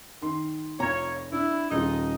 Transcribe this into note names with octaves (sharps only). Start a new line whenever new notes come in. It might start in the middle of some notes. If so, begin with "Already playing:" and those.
D#3 C6
F1 F4 C#5 A#5
D4 E4
D#1 D#4 F4 G#4 D#5